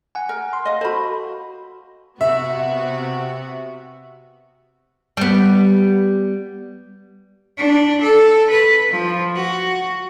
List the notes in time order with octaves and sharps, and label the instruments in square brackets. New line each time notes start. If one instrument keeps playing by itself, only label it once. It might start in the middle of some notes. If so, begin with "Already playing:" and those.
[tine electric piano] F#5 G#5
[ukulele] A#4
[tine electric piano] C6
[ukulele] D#5 F5
[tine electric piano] F#4 A4 [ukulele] C5 B5
[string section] C3 B3 F#4 [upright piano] E5
[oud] G3 B3
[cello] D4
A4
B4
F3
F#4